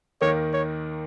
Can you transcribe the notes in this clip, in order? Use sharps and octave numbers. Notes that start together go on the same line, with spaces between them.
D#2 D#3 A#3 C#5
C#5